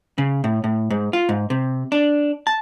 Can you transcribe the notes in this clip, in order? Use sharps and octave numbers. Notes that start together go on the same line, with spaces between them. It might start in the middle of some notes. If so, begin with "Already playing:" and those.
C#3
A2
A2
G#2
F4
G#2
C3
D4
A5